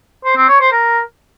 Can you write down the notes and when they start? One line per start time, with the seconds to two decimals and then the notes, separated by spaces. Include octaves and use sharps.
0.25 C5
0.36 C4
0.48 C#5
0.60 C5
0.72 A#4